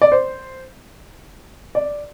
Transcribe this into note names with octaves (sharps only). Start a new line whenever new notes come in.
D5
C5
D5